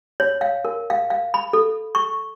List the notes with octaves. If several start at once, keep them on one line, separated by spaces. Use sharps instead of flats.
C#5
F5
A#4
F5
F5
B5
A4
C#6